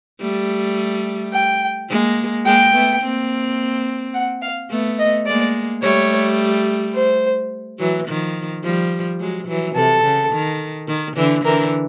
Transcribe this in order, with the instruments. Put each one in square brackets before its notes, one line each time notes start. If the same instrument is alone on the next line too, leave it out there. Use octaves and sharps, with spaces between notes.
[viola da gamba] G3 A3
[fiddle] G5
[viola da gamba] G#3 A#3
[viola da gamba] G#3 A#3 [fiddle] G5
[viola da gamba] A3 B3
A#3 C4
[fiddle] F#5
F5
[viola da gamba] A3 B3
[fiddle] D#5
[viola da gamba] G#3 A#3 [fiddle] D5
[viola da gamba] G3 A3 [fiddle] C#5
[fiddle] C5
[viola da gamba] E3 F#3
D#3 F3
F3 G3
F#3 G#3
E3 F#3
[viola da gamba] C3 [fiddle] A4
[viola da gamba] C#3
D#3
D#3
D3 E3
[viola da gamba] D3 E3 [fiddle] A#4